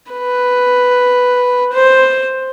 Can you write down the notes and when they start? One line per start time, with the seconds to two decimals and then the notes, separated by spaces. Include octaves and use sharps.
0.12 B4
1.73 C5